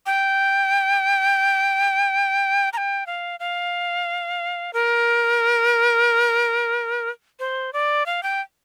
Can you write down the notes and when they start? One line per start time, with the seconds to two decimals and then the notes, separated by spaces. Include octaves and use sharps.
0.06 G5
2.73 A#5
2.77 G5
3.07 F5
3.40 F5
4.73 A#4
7.40 C5
7.73 D5
8.06 F5
8.23 G5